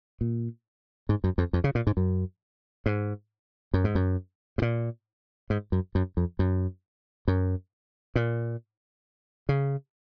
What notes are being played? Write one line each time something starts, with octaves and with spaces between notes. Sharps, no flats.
A#2
G#2
F#2
F2
F2
C#3
A#2
G#2
F#2
G#2
F#2
G#2
F#2
G#2
A#2
G#2
F#2
F#2
F2
F#2
F#2
A#2
C#3